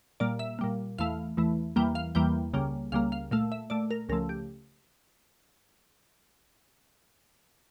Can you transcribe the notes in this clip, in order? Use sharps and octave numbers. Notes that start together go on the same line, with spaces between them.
A#2 G3 A#3 D5
E5
A#2 G3 A#3
E2 E3 A3 F5
E2 E3 A3
E2 E3 G3 A#3 G5
F5
E2 E3 G3 A#3 G5
C#2 C#3 G3 A#3
C#2 C#3 G3 A#3 F5
F5
A#2 A3 F5
E5
A#2 A3 D5
A#4
C#2 C#3 F3 A3 A#4
G4